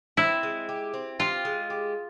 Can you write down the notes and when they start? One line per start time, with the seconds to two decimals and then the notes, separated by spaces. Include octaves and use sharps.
0.17 C4 E4
0.43 G#3
0.69 G4
0.94 C4
1.19 F4 G4
1.45 G#3
1.70 G4